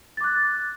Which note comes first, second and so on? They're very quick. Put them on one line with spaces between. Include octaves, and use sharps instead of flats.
A6 D6 F#6